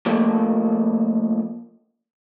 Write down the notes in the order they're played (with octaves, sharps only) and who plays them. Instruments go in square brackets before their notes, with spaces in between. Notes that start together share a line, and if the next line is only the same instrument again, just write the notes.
[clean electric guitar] F3 A3 A#3